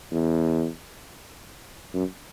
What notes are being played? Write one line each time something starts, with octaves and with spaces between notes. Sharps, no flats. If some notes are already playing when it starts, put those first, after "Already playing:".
E2
F#2